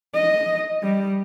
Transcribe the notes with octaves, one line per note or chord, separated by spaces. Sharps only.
D#5
G3